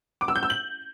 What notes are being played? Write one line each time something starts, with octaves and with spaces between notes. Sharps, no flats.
D6
E6
G6
E6
F#7